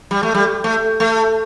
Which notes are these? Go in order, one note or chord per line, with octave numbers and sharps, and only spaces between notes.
G3
A3
G3
A3
A3